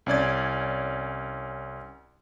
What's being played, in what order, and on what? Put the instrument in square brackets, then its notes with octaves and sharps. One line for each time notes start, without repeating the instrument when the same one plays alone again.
[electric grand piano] C2 C#4 D5 G#6